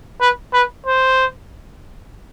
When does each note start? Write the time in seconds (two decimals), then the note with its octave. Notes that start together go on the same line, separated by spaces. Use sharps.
0.20 B4
0.53 B4
0.86 C5